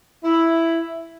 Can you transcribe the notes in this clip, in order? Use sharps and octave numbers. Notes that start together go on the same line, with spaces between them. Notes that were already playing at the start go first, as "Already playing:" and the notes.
E4